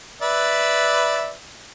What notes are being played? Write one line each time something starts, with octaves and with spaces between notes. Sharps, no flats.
B4 D5 E5